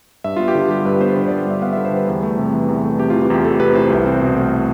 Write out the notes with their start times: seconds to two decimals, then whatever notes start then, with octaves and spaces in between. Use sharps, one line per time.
0.24 G2 E5
0.36 B3 F4
0.48 G4
0.55 D3 F4
0.70 G3 G4
0.85 G2 B4
1.01 B3 C5
1.16 D3 C5
1.28 G3 D5
1.47 G2 E5
1.62 B3 F5
1.73 D3 E5
1.85 C5
1.93 G3 B4
2.08 E2
2.23 A3
2.38 C3
2.54 E3
2.68 E2
2.84 A3
2.99 C3 G4
3.10 F4
3.14 E3
3.21 F4
3.30 E2 G4
3.45 A3 A4
3.60 C3 B4
3.75 E3 C5
3.90 C2
4.06 C4
4.21 B2
4.37 A3